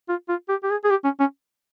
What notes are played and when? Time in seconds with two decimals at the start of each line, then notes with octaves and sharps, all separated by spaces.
0.09 F4
0.29 F4
0.49 G4
0.63 G4
0.70 G#4
0.84 G#4
0.90 G4
1.04 C#4
1.20 C#4